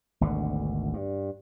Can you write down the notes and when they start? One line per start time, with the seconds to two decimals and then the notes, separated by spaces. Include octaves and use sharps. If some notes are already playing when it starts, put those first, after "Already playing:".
0.21 G#1 D2 B2 D3
0.94 G2